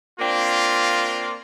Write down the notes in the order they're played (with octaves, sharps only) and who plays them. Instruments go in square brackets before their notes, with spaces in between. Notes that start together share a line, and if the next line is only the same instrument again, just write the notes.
[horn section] A#3 C4 D4 F4